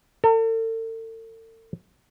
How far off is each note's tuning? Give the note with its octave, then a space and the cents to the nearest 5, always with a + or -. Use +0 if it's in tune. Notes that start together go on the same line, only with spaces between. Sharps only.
A4 +40